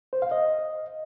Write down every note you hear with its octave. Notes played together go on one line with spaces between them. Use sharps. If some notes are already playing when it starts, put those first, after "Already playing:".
C5
F5
D#5